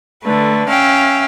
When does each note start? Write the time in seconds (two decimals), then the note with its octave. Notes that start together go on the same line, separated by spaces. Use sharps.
0.23 D3 A3 B4
0.68 C#4 E5 F5 G5